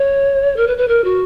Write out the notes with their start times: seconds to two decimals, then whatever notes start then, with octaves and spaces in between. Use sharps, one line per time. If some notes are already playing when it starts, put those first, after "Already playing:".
Already playing: C#5
0.57 A#4
0.67 B4
0.78 B4
0.88 A#4
1.04 F#4